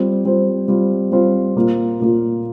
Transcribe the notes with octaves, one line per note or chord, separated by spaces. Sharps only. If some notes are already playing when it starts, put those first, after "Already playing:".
Already playing: G3 C4 F4 C5
G3 C4 F4 C5
G3 C4 F4 C5
G3 C4 F4 C5
A#2 A#3 F4
A#2 A#3 F4